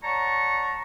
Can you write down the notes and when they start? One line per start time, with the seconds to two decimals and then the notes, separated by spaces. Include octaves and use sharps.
0.03 C#5 D5 F#5 A5 A#5 C#6